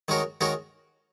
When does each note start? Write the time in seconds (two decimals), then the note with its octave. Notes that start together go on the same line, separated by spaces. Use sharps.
0.08 D#3 G#3 F#4 A#4 C#5
0.41 D#3 G#3 F#4 A#4 C#5